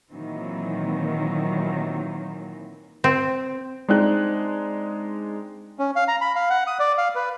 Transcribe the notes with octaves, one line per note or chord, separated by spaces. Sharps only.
A#2 D#3 E3 F#3 A#3 C4
C4
G#3 C4 D4 D#4 F#6
C#4
F5
A#5
B5
F5
F#5
D#6
D5
F5
B4